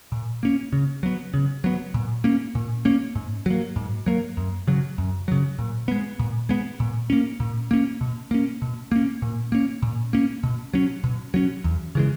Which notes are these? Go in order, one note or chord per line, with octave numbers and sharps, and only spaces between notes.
A#2
A#3 C#4
C#3
F#3 B3
C#3
F#3 B3
A#2
A#3 C#4
A#2
A#3 C#4
G#2
F#3 A#3
G#2
F#3 A#3
F#2
C#3 F#3
F#2
C#3 F#3
A#2
G#3 B3
A#2
G#3 B3
A#2
A#3 C#4
A#2
A#3 C#4
B2
A#3 C#4
B2
A#3 C#4
A#2
A#3 C#4
A#2
A#3 C#4
B2
F#3 C#4
B2
F#3 C#4
E2
C#3 E3 G#3